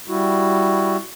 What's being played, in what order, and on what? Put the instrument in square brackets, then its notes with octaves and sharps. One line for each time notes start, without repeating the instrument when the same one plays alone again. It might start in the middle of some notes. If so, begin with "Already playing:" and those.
[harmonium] G3 E4 F#4